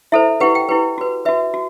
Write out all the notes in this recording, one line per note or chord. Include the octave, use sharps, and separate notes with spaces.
E4 A4 C5 E5
E4 G4 B4 F#5
G5
E4 G4 B4
F#4 B4
F#4 B4 E5
F#4